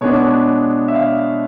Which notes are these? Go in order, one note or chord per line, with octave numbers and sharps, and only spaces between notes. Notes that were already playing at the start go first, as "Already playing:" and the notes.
B2 G#3 B3 D4 C#5
E5
F5